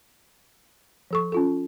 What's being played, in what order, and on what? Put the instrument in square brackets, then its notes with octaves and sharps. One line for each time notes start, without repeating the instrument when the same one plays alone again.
[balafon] F3 A4 C#6
C#4 F4 A4